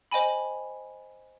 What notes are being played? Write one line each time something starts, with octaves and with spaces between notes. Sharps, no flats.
C5 D#5 G5 G#5 B5